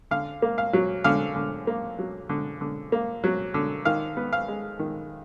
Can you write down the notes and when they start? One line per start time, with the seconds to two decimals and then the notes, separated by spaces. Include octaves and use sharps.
0.11 D3 F5
0.42 A#3
0.58 F5
0.73 F#3
1.04 D3 F5
1.36 D3
1.67 A#3
1.98 F#3
2.29 D3
2.61 D3
2.92 A#3
3.24 F#3
3.54 D3
3.85 D#3 F5
4.17 B3
4.33 F5
4.48 G#3
4.79 D#3